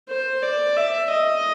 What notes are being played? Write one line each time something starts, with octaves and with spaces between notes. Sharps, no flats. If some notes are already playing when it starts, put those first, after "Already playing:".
C5
D5
E5
D#5